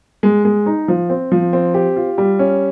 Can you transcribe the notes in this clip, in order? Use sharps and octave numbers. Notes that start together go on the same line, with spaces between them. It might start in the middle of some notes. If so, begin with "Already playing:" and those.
G#3
G#3
D#4
F3
C4
F3
C4
G4
F4
G3
C#4